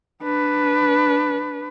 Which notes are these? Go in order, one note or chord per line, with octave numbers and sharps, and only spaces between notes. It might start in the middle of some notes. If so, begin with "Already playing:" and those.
D4 B4